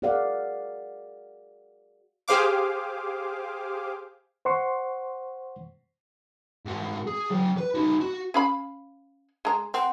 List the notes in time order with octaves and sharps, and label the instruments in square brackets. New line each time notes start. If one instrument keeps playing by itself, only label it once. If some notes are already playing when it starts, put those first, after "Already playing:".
[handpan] F#4 G#4 A#4 D5 F5 F#5
[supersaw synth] G4 G#4 C5 F5 D6
[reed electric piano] C5 F#5 C6 C#6
[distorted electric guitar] G#2 F#4
G#4
F#3 G5
B4
D#4 F#4
F#4
[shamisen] C#4 F5 B5
G#3 A#5
[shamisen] C4 [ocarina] F#5